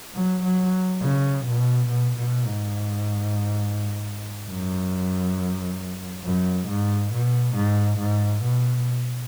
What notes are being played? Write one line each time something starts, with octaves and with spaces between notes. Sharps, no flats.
F#3
F#3
C#3
B2
B2
B2
G#2
F#2
F#2
G#2
B2
G#2
G#2
B2